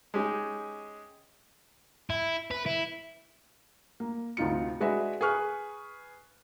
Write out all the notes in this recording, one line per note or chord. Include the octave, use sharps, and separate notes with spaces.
G#3 C#4 D#4 G4 G#4
E4
B4
E4
A#3
D2 C3 D#4 F4 C#7
G#3 D4 F#4 G#4 B4 E5
G#4 B4 C#6 F6 F#6